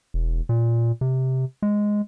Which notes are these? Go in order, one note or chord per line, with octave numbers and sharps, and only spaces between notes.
E1
A#2
C3
G#3